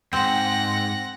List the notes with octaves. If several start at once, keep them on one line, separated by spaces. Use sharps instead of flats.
F2 G#2 C4 F#5 A#6